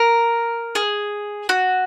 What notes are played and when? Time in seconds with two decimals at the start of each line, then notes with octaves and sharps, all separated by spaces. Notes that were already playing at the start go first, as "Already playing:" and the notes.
Already playing: A#4
0.75 G#4
1.49 F#4